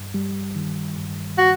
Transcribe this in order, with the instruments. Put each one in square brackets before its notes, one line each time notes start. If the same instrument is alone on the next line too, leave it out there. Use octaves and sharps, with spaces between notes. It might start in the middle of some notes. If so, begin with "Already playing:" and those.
Already playing: [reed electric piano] G2
G3
D#3
G2
[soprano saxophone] F#4